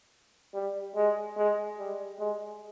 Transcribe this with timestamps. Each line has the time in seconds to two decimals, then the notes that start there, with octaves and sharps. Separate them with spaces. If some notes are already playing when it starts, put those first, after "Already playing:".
0.54 G3
0.95 G#3
1.37 G#3
1.78 G3
2.19 G#3